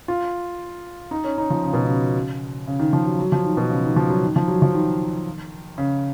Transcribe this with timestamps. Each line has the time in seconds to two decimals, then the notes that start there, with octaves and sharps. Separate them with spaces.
0.08 F4
1.11 D#4
1.24 C#4
1.38 D#4
1.50 F3
1.64 C#3
1.73 B2
1.85 C#3
2.68 C#3
2.80 D#3
2.93 F3
3.06 F#3
3.19 F#3
3.32 F3
3.45 D#3
3.57 B2
3.70 C#3
3.84 D#3
3.96 F3
4.10 F#3
4.23 D#3
4.36 F3
4.48 F#3
4.62 F3
4.74 D#3
5.78 C#3